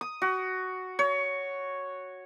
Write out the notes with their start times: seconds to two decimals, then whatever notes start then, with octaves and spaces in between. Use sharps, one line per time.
0.01 D#6
0.22 F#4
0.99 C#5